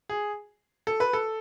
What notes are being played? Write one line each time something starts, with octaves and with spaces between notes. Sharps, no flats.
G#4
A4
B4
A4